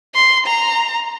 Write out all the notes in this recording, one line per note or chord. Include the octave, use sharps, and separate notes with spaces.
C6
A#5